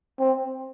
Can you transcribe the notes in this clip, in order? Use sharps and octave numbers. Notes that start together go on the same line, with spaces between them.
C4